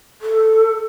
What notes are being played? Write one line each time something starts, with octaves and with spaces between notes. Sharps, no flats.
A4